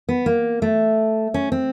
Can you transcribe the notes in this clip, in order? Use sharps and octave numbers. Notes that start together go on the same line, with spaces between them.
B3
A#3
A3
C#4
C4